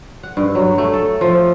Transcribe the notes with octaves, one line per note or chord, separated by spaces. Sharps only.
F#5
G2
F#3
A3
A4
F3